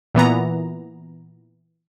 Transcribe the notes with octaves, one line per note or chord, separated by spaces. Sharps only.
A#2 E3 B3 A#5